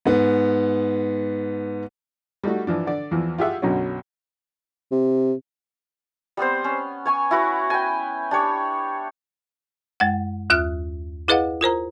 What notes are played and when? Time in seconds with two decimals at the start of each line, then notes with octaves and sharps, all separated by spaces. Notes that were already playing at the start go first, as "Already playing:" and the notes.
0.06 G#2 B3
2.44 G3 A3 D#4 F#4
2.67 E3 F3 D4
2.87 D3 D5
3.11 E2 E3 F3
3.38 F4 G4 G#4 E5 F#5
3.62 B1 F#2 B2 D3 C#4
4.91 C3
6.37 G3 B3 C4 C5
6.64 C#4
7.06 C#5 G#5 C#6
7.31 E4 F#4 B4
7.70 G5 G#5
8.31 D4 G4 C#5
10.00 F#2 G#3 F#5
10.50 D#2 F4 E5 F6 F#6
11.28 E4 G#4 B4 D#5 F5 F#5
11.61 F4 A#4 C5 A#5